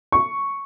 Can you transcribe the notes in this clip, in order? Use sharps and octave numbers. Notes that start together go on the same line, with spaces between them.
C#6